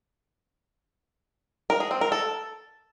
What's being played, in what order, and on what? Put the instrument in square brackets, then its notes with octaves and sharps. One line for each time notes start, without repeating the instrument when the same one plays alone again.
[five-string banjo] A#4
G#4
C4
A#4
A4